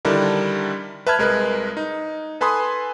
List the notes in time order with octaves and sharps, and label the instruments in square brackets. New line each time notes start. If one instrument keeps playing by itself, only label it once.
[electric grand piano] D3 D#3 G3 D4 E4 A#4
B4 E5 A5 B5 F6 G#6
C2 G#3 A#4 B4 F#6
D#4
A4 B4 G#5 B5 C6 D#6